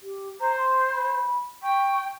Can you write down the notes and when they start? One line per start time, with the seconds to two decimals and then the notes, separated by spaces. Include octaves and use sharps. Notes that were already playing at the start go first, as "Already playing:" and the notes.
0.01 G4
0.40 C5 A#5
0.57 C6
0.91 B5
1.63 G5 C#6